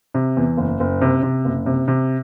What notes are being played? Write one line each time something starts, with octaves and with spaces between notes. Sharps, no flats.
C3
E2
F#1
F#1
C3
C3
F#1
C3
C3